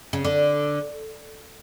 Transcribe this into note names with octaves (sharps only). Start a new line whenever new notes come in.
C#3
D3